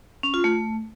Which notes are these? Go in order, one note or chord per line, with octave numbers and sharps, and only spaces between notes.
C#4
F4
A3